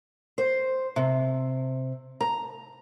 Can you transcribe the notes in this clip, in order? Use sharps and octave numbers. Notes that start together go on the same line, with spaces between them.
C5
C3
A#5